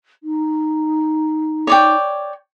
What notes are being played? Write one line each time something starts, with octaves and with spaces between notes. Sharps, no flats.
D#4
C#5 D5 G5